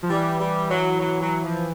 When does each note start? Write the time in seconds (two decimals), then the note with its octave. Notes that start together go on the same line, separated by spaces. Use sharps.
0.03 F3
0.10 E3 G3
0.39 G3
0.70 F#3
0.99 F#3
1.21 F#3
1.44 F3